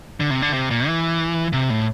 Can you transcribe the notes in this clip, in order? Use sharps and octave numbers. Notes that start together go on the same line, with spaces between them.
D3
C3
D3
C3
A#2
E3
C3
A2